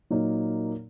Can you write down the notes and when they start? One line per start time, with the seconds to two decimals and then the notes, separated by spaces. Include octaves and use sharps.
0.10 A#2 F#3 A#3 D#4 A#4